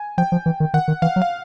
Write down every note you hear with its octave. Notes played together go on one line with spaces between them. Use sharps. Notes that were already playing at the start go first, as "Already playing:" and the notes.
Already playing: G#5
F3 G5
F3
E3
D#3
D#3 F#5
D#3
E3 F5
F#3
F5